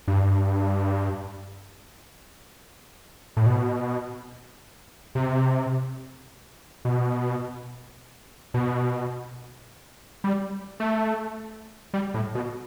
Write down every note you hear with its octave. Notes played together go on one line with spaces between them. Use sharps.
G2
A2
B2
C3
B2
B2
G3
A3
G3
A2
B2